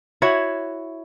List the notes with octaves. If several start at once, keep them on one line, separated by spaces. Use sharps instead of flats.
E4 F#4 C#5 E5